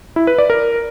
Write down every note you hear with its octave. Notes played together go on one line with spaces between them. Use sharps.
E4
B4
D5
A#4